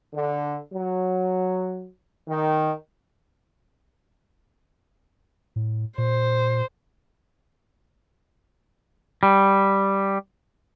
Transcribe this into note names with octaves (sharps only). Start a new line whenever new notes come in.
D3
F#3
D#3
A2
A#2 C5
G3